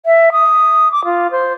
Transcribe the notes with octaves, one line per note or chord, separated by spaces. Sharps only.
E5
D#6
D6
F4
C5